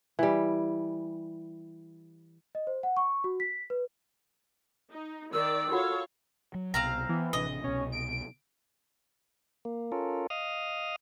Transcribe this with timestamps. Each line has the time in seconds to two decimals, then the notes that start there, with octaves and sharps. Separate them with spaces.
0.19 E3 G3
2.55 D#5
2.67 C5
2.83 F#5
2.97 C#6
3.24 F#4
3.40 B6
3.70 B4
4.90 D#4
5.33 D#3 A#4 D5 E6
5.71 F4 F#4 A4 C#5 F5 F#5
6.54 F#3
6.74 C2 B2 C4 F5 A#5
7.09 E3 B3
7.33 A1 C3 D4 D#5
7.64 C2 B2 C#4
7.92 D7
9.65 A#3
9.92 C#4 F4 A4 A#4
10.30 D#5 F5 D#6 F6